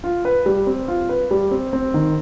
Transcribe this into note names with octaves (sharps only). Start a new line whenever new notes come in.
F4
B4
G3
C4
F4
B4
G3
C4
C4
D#3